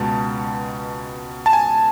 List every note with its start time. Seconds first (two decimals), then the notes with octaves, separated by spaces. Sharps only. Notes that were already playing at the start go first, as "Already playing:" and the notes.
Already playing: C#2 B2 G#3 A5
1.46 A5
1.53 G#5